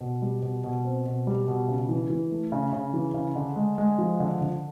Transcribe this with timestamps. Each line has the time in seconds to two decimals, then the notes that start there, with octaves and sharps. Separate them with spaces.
0.01 B2
0.22 G3
0.42 B2
0.64 B2
0.85 C4
1.06 B2
1.27 G3
1.48 B2
1.68 C#3
1.89 E3
2.10 E3
2.31 A3
2.52 C#3
2.73 C#3
2.94 E3
3.14 C#3
3.36 D3
3.56 G#3
3.78 G#3
3.98 F3
4.20 D3
4.41 D3